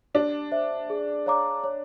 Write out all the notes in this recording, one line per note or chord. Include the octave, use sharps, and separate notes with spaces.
D4 G4
C5 E5
G#4
C#5 F5 A#5 D6
C#5